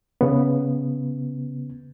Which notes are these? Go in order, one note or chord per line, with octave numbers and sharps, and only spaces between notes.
C#3 B3